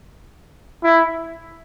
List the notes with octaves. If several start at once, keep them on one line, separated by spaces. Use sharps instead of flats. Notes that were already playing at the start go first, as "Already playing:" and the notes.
E4